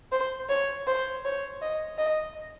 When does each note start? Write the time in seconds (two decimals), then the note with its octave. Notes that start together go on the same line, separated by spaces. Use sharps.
0.12 C5
0.49 C#5
0.87 C5
1.24 C#5
1.61 D#5
1.98 D#5